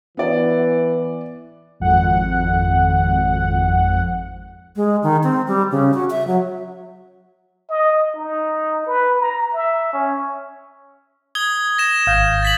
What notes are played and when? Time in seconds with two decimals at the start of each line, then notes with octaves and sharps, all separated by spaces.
0.17 E3 B3 D5
1.80 G#1 F2 F#5
4.76 G#3
5.03 D#3
5.23 C4
5.48 G3
5.71 C#3
5.94 F#4
6.10 E5
6.27 F#3
7.70 D#5
8.15 D#4
8.86 B4
9.20 A#5
9.53 E5
9.93 C#4
11.35 D#6 G#6 G7
11.78 A#6 E7
12.07 G#1 F5 G6
12.43 A6 B6 F#7